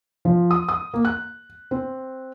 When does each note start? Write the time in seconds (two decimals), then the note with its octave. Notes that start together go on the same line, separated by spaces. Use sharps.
0.25 F3
0.51 D#6
0.69 D#6
0.94 A#3
1.05 F#6
1.71 C4